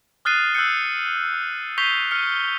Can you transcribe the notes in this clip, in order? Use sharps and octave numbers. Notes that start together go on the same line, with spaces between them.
D#6 F6 F#6 A6 C7 D#7
E6 F#6 G6 C#7
C#6 G6 B6 C7 F7 G7
F6 C#7